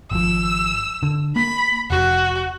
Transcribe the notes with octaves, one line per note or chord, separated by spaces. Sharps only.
G#1 F3 E6
D3
A#3 B5
F1 F#4